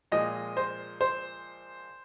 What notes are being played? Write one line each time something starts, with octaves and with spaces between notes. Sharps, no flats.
A#2 F3 G#3 D#5
C5
C5